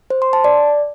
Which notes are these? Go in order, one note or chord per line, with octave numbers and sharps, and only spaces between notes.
C5
C6
A5
D5